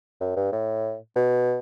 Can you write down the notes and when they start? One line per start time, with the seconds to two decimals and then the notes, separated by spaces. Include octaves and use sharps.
0.21 F#2
0.37 G2
0.52 A2
1.16 B2